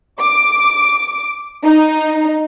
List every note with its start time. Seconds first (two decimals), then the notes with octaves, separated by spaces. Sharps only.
0.20 D6
1.64 D#4